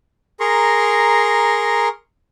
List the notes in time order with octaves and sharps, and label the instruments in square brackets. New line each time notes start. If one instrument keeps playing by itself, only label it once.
[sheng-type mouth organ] G#4 A#4 A#5 C6 C#6